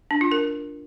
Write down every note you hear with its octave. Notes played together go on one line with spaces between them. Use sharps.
D4
F4
A#4